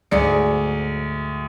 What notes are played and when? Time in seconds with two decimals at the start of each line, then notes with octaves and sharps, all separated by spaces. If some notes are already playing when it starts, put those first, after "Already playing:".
0.11 D2 G#2 F#3 G#4 D5 C#7